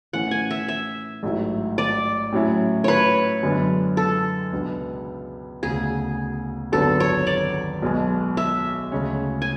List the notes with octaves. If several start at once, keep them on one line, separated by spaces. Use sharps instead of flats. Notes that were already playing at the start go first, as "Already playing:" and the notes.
A2 E3 A3 C#4 F#5
G#5
E5
E5
A1 G#2 F#3 A3 E4
D5
A2 F#3 C#4 E4
B4 C#5
F#2 D3 G#3 B3 D4
A4
C#2 B2 G#3 B3 D4
E1 D2 C#3 G#4
G#1 F#2 D3 F#3 B3 A4
C#5
D5
B1 B2 G#3
E5
D2 C#3 G#3 C#4
G#5